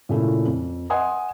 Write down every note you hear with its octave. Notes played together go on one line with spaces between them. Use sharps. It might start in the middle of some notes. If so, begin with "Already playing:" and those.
A#2 C#3 A3 E4
F2
D#5 F#5 G#5 C6 D#6